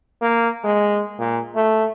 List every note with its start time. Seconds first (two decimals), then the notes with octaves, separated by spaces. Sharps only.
0.22 A#3
0.64 G#3
1.19 A#2
1.55 A3